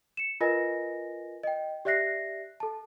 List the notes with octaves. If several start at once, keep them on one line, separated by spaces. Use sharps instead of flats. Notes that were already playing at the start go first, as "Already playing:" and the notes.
C#7 E7
F4 A#4 B4 D#5 G#5 A#6
D#5 G5
G4 D5 E5 F#6 A#6 C7
A4 A5